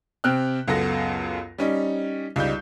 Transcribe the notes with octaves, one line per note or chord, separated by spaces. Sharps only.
C3 C4 G5 F6 F#6
C#2 F#2 B3 A4 F#5 A#6
G3 C#4 D#4
C#2 G3 D#4 G6